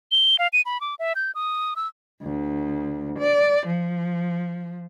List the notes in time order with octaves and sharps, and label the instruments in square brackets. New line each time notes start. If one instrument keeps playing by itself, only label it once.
[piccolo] G7
F5
D#7
B5
D6
E5
G6
D#6
E6
[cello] D2
D5
F3